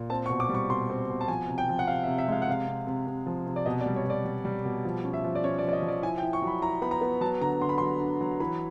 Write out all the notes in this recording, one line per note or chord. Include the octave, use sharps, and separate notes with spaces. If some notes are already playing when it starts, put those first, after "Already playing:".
Already playing: A#2
C4 A5
C#6
B2
D6
G3
C#6
B2 C6
C4
B2
A5
F3 G#5
C3
G5
F3
F#5
C3 F5
E5
C3
E5
G#3 F5
F#5
C3 F5
C3
C3
C3
F3
C3
D5
B2 D#5
D5
G3
C#5
B2 D5
G3
G3
B2
F3
C#4
E5
F3
D5
C#4 C#5
D5
F3
D5
D#5
F3
D5
E4 G#5
G5
E4
C#6
F#3
B5
E4 A#5
B3 B5
A#5
B3
F#3 A5
D3 A#5
D3 C6
B5
F#3 C6
D4
F#3
E3 B5